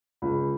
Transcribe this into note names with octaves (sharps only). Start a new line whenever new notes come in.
C#2